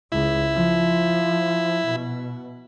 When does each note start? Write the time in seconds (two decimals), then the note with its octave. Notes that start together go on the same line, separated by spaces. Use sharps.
0.12 C#2 E4
0.54 F3
1.86 B2